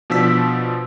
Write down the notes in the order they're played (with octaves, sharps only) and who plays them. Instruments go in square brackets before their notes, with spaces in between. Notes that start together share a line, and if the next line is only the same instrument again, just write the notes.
[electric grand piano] B2 F3 D4 E6 B6